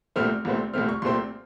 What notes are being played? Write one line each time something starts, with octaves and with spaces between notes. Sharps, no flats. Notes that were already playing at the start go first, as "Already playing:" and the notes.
C2 A#2 A3 C4 F6
C2 A#2 A3 C4
C2 A#2 A3 C4 F6
C#6
C2 A#2 A3 C4 C6